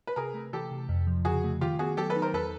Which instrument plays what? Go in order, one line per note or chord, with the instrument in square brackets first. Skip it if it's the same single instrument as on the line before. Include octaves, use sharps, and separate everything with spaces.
[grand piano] B4
[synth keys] C3 [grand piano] G#4 A#4
[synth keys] A3
[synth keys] E3 [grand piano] G4 A4
[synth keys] C3
F2
F3
[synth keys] C#3 [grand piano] F#4 G#4
[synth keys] A3
[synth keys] D#3 [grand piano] F4 G4
[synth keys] B3 [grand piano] F#4 G#4
[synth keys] F#3 [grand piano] G4 A4
[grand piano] A4 B4
[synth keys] D#4
[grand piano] A#4 C5
[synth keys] E2 [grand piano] A4 B4